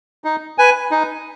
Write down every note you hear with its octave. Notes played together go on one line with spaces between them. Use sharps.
D#4
B4 G#5
D#4